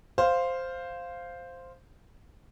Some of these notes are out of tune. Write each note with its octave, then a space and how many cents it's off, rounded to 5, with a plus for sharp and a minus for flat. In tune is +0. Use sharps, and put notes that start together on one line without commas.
C5 +0 F5 +0